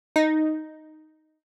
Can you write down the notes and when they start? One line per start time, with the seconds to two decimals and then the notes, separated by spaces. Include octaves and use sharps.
0.16 D#4